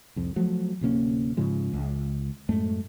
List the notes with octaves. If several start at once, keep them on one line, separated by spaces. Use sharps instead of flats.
C2 F2
F3 F#3 A3
D1 C3 A#3 C#4
G#2 C#3 F3 G#3
C#2
F#2 A2 G#3 A3